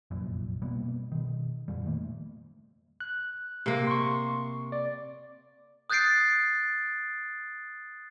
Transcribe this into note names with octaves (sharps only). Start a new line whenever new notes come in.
F1 A#1 F#2 A#2
B2 G3 A#3 B3
B2 D#3
F2 A#2 G3
D#3 A3 A#3
F#6
C3 A#3
C6 C#6
D5
D#6 F#6 G6 A6 C7 D7